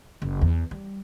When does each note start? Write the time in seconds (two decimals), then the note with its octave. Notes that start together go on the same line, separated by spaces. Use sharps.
0.22 F#1
0.41 E2
0.71 G3